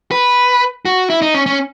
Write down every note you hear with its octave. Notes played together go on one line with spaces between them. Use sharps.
B4
F#4
E4
D#4
C#4
C#4